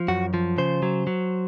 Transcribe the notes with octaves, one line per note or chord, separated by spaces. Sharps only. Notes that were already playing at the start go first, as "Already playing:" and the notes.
Already playing: F3
F#2 F#4
F3
C#3 C5
F#3
F#3